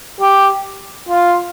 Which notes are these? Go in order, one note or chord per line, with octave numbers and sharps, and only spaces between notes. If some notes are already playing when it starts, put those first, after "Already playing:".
G4
F4